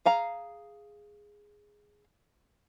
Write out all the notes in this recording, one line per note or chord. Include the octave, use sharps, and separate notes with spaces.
G#4 F5 A#5